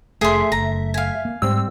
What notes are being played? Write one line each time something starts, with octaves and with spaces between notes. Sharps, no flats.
F1 A3 G#4 E5 C6
F#1 A#5
F5 G#5
A#3
G#2 G3 C4 E6